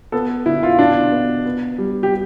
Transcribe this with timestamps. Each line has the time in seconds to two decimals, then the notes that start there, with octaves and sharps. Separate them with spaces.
0.12 B3 A4
0.46 D3 E4
0.63 F4
0.78 B2 D4
1.11 B3
1.45 B3
1.78 G3
2.03 G4